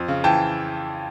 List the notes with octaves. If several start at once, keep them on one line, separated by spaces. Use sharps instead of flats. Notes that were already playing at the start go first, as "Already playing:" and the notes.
Already playing: F2
C#3
E3 G5 A5